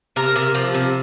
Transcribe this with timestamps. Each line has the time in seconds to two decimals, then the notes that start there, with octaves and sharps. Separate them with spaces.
0.16 C3 A#4
0.36 C3
0.55 F3
0.74 C3